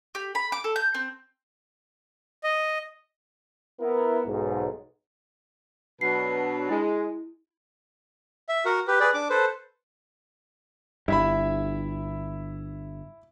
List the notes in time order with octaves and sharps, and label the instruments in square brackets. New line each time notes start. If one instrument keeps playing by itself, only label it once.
[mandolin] G4
B5
D6
A4
G6
C4
[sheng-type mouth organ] D#5
[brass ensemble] B3 E4 A#4
B1 G#2
[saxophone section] B2 F#3 [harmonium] D4 B4 [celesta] C7
[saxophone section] G#3 [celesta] E4
[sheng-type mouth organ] E5
F#4 A#4 F#5
G4 B4
G#4 B4 D5
D4 D6
A4 B4 C5
[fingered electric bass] G1 G2 [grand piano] E4 E5 B5